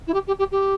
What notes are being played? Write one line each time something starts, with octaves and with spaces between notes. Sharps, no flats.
E4
G4
G4
G4
G4